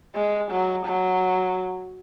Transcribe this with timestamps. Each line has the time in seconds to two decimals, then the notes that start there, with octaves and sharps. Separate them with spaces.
0.16 G#3
0.51 F#3
0.86 F#3